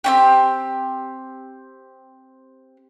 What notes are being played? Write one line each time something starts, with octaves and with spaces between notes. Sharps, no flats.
C4 C#4 G4